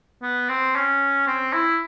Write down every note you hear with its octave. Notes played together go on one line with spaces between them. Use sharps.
B3
C4
C#4
C4
E4